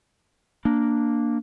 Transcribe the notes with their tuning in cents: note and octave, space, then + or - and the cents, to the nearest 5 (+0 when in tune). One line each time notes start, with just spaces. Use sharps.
A#3 +0 D4 +0